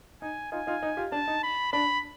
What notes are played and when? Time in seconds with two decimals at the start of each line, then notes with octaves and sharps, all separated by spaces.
0.22 D#4 G#5
0.52 D#4 F4 G#5
0.67 D#4 F4
0.83 D#4
0.97 F4 G4
1.12 D4 A5
1.28 D#4
1.43 B5
1.73 D4 B5